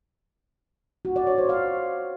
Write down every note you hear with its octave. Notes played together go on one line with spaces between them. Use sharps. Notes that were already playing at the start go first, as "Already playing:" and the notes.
F#4
D5
C#5
C5
F5